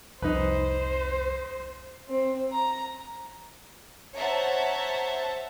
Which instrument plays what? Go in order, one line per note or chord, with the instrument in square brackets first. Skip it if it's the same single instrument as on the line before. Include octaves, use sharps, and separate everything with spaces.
[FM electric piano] C2 F2 [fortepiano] D#4 B4 [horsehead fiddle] C5
[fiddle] C4
A#5
[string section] C5 C#5 E5 F#5 A5 A#5